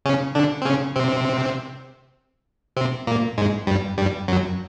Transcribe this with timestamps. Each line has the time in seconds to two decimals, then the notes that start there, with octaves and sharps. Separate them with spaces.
0.05 C#3 C#4
0.35 D3 D4
0.62 C4
0.65 C#3 C#4
0.95 C3 C4
2.77 C3 C4
3.07 A#2 A#3
3.37 G#2 G#3
3.67 G2 G3
3.98 G2 G3
4.28 F#2 F#3